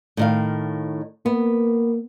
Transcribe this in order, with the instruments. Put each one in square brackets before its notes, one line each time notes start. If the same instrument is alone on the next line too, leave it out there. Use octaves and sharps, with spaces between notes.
[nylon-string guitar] A2 D#3 F5
[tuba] A#3 [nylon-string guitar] B3